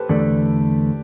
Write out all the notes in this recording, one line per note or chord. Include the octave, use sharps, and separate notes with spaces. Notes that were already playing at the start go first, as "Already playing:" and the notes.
Already playing: G4 A4 B4 C5
E2 D3 A3 D5